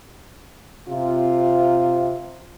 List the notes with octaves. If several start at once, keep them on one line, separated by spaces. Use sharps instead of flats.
C3 F4